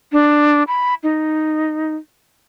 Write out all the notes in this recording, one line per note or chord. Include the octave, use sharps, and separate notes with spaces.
D4
B5
D#4